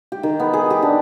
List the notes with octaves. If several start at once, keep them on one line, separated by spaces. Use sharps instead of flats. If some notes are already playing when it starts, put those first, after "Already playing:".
G4
D#3
B3
G#4
G4
D4